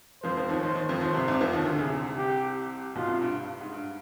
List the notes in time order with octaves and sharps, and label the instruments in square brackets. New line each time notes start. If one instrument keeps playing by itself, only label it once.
[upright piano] F2 F3 [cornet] C5
[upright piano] F2 F3
D#2 D#3
[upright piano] D#2 D#3 [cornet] C5
[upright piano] D#2 D#3
F2 F3
[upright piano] D#2 D#3 [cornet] C5
[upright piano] C2 C3
C2 C3
F2 F3
D#2 D#3
D2 D3
[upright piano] C2 C3 [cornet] G#4
[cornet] G4
[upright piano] B1 B2 [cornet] F4
[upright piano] C2 C3
G2
G2
G2
G#2
G2